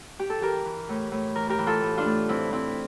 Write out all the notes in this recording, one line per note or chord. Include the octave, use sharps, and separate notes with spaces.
G4
A4
E3 G4 A#4
E3
A2
A2
E3 A#4
G4 A#4
E3
F4 A4
A2
D4 F4
A2
E3 C4 E4
E3 C4 E4